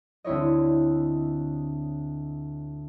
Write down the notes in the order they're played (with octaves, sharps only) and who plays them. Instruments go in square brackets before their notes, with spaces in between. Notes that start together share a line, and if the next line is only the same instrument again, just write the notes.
[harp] D2 C4 E4 C#5 D#5